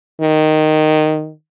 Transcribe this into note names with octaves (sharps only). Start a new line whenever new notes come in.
D#3